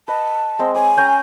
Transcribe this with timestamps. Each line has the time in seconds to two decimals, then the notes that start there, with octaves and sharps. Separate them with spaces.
0.08 B4 D#5 A5
0.59 G#3 C4 D#5
0.75 C#5 G#5 D6
0.97 C#4 G5 A#5